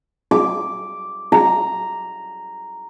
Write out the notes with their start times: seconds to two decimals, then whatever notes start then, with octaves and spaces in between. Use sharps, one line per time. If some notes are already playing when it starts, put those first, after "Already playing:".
0.31 D6
1.32 A#5